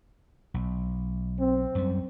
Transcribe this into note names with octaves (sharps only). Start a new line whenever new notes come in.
B1
C4
F#2 G3